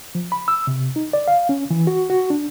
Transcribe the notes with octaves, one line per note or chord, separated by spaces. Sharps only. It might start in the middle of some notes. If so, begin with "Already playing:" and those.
F3
B5
E6
C3
D#4
D5
F5
C#4
E3
F#4
F#4
D4